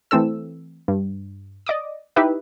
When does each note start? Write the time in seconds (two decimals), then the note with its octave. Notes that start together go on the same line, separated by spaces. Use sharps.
0.11 E3 A3 C4 A4 E6
0.88 G2
1.66 D5 D#5 D6 D#6
2.16 D#4 E4 G4 B4 E5